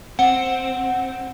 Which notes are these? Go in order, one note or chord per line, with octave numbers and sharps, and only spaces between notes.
C4 F#5